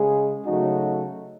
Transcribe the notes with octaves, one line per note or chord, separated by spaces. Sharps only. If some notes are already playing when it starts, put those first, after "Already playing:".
Already playing: C#3 G#3 C#4 G#4
C#3 F#3 A3 D#4 F#4